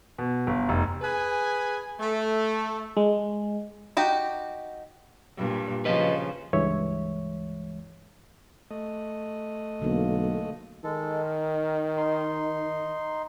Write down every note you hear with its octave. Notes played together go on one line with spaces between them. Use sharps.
B2
G1
F1
G#4 B4 G#5
A3
G#3
D#4 F#4 G4
G2 A#2
C#3 F3 B4 D#5
C#2 G2 E3 G#3 C#5 E5
A3 D#5
B1 D3 A#3
D#3 G#3 A4
A#4
D#4 C6